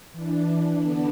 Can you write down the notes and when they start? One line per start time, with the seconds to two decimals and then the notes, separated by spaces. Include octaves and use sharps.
0.13 E3 D4
0.77 D3 B3 D4